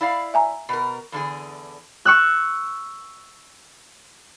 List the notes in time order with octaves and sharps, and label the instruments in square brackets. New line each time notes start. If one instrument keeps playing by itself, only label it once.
[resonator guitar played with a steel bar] E4 D5 F5
[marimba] E5 G#5 A#5
[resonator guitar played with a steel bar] B2 A#4
E2 D3 G#4
[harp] C#6 E6 F#6